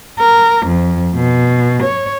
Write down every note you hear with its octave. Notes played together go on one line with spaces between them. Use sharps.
A#4
F2
B2
C#5